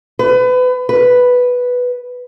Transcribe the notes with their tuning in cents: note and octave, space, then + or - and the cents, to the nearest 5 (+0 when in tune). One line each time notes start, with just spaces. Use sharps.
B4 +30
B4 +0